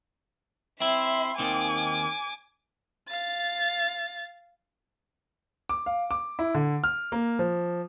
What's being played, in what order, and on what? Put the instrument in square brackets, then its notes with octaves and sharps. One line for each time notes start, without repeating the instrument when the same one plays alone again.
[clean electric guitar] C4 E4 [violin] E5 C6
[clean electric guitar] D#2 D#3 C4 [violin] G#5 D6
[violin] F5 A6
[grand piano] D6
F5
D6
E4
D3
F6
A#3
F3